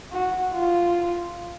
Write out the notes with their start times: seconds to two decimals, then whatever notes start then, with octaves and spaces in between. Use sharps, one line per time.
0.13 F#4
0.54 F4